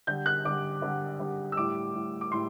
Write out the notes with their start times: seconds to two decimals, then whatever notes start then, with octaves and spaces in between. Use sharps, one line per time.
0.07 D3 G3 G6
0.26 F#6
0.45 D3 G3 D6
0.82 D3 G3
1.19 D3 G3
1.52 E6
1.57 A2 G3 D6
1.94 A2 G3
2.21 D6
2.31 A2 G3 C6